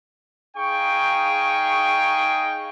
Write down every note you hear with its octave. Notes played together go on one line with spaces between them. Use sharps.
D#4 G#4 F5 G5 C#6